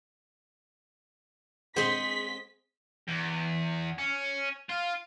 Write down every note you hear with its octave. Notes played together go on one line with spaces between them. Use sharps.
G#3 C4 G#4 C5 F#5 B6
E2
C#4
F4